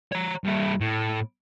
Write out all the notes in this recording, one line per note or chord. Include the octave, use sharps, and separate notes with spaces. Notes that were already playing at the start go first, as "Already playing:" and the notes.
C#5 A#5
G2 E4
A2